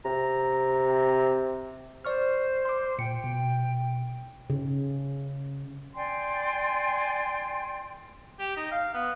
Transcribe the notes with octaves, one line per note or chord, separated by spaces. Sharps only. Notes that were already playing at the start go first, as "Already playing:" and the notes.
C3 A#5
C5 D5 C#6 F6
C6 D6
A#2 G5 C#7
B2
C#3
D5 G5 G#5 C6
G4
D#4
F5
B3